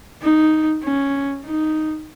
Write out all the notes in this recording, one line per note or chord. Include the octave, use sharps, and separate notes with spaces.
D#4
C#4
D#4